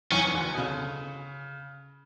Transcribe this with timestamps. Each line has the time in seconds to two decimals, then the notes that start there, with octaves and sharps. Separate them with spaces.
0.11 E2 E3 C#4
0.25 E3
0.34 D2 D3
0.54 B2
0.58 C#3